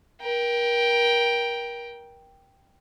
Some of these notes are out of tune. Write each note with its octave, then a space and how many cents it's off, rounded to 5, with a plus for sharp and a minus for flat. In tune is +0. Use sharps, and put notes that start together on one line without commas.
A#4 +30 G5 +0